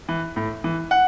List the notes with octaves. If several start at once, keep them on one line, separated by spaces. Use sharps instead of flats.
E3
A2
E3
F#5